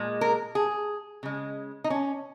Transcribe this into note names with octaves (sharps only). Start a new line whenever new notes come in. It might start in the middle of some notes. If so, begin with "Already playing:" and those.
Already playing: A#2 G#3
A#4
G#4
C#3 G#3
D#4
C#4